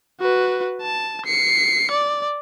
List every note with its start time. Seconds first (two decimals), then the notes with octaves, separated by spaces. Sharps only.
0.20 F#4 B4
0.81 A5
1.25 C7 C#7
1.91 D5